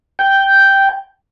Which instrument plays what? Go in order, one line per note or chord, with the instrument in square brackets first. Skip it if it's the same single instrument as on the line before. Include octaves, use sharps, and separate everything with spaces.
[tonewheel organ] G5